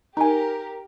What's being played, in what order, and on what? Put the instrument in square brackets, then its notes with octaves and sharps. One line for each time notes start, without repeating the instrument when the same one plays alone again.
[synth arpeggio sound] D#4 G#5 [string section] G4 A#4